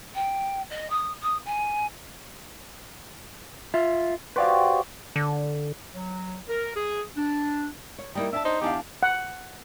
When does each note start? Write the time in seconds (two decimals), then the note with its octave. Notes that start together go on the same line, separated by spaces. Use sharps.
0.15 G5
0.69 D#5
0.90 D#6
1.22 D#6
1.45 G#5
3.74 F4 E5
4.36 F#4 G4 B4 C5 D5 F5
5.16 D3
5.95 F#3
6.48 A#4
6.75 G#4
7.17 D4
7.98 C#5
8.15 G3 A#3 D#4 E4
8.33 D4 E5 G#5 A5
8.45 D#4 C5
8.61 E2 D4 G4 F5
9.03 F#5